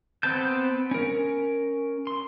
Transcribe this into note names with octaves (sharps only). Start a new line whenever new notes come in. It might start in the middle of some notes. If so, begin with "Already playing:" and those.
B3 C4 B4 A5 G6
C#4 A#4
C6